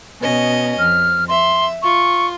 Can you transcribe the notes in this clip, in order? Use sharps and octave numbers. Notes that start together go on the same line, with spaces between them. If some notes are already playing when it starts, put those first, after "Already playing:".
B2 C#4 D#5
F2 F6
E5 C6
F4 C#6